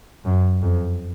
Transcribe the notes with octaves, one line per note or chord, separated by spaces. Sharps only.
F#2
F2